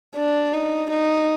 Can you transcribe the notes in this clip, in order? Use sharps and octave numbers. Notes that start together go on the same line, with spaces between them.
D4
D#4
D#4